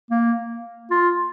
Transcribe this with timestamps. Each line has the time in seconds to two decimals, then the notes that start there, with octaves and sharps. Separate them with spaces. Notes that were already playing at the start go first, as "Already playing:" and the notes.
0.11 A#3
0.91 F4